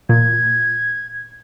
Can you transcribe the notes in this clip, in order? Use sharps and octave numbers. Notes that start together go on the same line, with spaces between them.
A#2 G#6